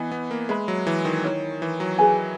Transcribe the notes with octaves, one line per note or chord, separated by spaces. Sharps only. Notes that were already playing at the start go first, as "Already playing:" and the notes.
Already playing: E3 B3 D#5 G#5
B3
A#3
G#3 B4 E5 B5
F#3
E3
D#3
E4 A#4 C#5
E3
F#3
G#4 B4 E5 G#5